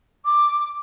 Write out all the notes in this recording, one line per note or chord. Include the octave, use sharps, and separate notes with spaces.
D6